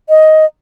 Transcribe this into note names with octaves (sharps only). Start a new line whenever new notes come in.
D#5